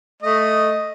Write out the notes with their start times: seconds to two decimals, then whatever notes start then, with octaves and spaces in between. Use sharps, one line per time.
0.23 A3 D#5